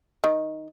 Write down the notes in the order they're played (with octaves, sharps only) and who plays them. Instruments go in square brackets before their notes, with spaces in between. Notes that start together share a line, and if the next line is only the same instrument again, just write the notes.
[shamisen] D#3